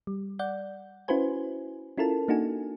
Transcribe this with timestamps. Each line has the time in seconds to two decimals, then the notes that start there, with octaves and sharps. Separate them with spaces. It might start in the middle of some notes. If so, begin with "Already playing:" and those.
0.07 G3
0.39 D5 F#5 G6
1.08 C#4 E4 F#4 B4 C5 G#5
1.98 C#4 E4 F4 A4 A#4 A5
2.28 A#3 D4 D#4 F#4 A4 G#5